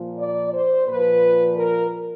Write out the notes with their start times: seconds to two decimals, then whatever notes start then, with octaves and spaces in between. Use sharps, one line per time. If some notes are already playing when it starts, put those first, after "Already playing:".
Already playing: A#2 F3
0.18 D5
0.53 C5
0.88 A#2 F3 B4
1.56 A#4